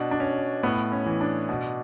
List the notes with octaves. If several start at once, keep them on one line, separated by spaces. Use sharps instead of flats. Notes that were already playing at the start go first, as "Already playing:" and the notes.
Already playing: B2 D4
D4
C#4
A2 B3
C#4
E3
D4
B2